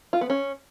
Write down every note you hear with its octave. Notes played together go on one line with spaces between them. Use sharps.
F4
B3
C#4